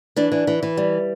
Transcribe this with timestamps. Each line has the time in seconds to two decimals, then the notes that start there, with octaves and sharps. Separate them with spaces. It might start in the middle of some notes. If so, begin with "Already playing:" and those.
0.16 E3 D4
0.32 E3
0.47 E3
0.63 E3
0.77 G3